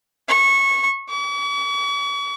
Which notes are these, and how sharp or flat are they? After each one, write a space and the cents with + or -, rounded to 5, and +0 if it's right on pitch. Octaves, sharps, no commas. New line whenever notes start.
C#6 -20
C#6 +45